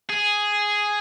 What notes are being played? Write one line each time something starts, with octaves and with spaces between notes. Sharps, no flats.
G#4